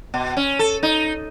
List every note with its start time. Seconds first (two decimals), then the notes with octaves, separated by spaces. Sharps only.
0.14 B2
0.37 C#4
0.59 A4
0.83 D#4